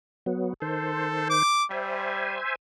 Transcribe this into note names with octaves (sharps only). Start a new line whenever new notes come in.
F#3 B3
D#3 A4 C5
D6
G3 C5 E5 G#5